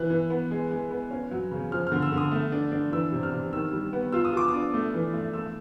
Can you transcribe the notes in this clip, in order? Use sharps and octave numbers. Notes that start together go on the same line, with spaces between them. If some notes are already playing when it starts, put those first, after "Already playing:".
Already playing: E3 F#6
E3
B3
G#3
G#3
B3
C#4
F#3
C#3
F3 F6
F6
D3
E6
D3
D#6
A3
D4
D4
E3 E6
C3
F6
C3
D#3 E6
G3
B3
F4 E6
D#6
F4 D6
D#6
D4
A3
E3
A3
A3 E6